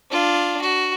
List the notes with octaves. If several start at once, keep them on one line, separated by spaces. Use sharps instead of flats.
D4 F4
F#4